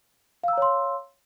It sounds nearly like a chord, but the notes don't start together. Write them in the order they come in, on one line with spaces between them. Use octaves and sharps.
F5 E6 A#5 C#5 C6